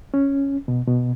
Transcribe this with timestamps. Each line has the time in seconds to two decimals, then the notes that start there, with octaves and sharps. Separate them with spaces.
0.14 C#4
0.68 B2
0.88 B2